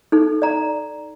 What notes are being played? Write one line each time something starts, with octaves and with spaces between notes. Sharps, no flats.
D#4 A4
D5 A#5